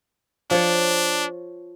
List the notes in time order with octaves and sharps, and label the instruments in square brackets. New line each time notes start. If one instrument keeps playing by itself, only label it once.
[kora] F3 C#5 [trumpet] D4